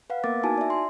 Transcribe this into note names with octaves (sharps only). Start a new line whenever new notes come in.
B4 F5 F#5
A#3 B3 A#4 D6 A6
D#4 E4 F#4 G#5 A5
D5 E5
C6